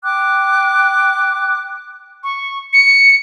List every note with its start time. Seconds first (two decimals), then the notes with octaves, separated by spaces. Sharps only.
0.04 G5 D6 F#6
2.23 C#6
2.73 C#7